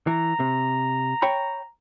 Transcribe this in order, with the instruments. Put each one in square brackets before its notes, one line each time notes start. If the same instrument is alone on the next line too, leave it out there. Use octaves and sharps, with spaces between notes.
[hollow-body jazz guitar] E3 [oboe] A#5
[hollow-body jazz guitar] C3
C#5 G5 B5